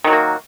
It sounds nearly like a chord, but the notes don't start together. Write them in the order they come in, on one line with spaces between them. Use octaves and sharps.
D#3 F#3 F#4 A#3